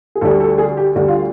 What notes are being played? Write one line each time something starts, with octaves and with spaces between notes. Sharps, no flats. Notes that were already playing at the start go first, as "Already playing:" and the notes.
G#4
D2 D3 G3 A4
A4
G#4
G4
D2 D3 G3 F#4
F4